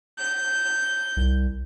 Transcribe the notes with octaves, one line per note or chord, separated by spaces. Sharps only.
G6
C2